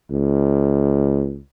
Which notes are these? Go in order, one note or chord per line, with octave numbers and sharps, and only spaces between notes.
C#2